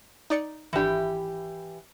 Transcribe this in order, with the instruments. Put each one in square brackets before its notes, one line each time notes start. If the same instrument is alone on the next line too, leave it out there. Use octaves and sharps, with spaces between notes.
[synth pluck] D#4 D5 C#7
[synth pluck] G#1 D4 [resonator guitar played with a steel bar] E3 G4